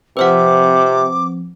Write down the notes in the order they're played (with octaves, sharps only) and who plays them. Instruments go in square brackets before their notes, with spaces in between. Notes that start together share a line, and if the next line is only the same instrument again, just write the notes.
[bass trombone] C3 [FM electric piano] F3 C4 [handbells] B4 C5 F#5 [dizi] D6